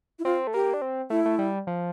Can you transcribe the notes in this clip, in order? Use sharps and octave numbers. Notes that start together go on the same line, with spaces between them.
E4
C4 F4
A3
A#3 G4
D4
C4
A3 E4
A3
G3
F3